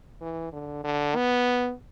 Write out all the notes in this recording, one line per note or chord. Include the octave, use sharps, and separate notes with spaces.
E3
D3
D3
B3